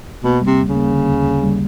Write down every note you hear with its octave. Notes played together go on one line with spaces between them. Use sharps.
B2 A#3
C3 G3
D#2
C#3
A#3
D3
D#2
D#2
G3